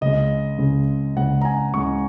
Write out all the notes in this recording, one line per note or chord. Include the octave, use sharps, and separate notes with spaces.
C#2 C#3 G#3 D#5
C#2 C#3 G#3
C#2 C#3 G#3 F#5
A#5
G#5
C#2 C#3 G#3 C#6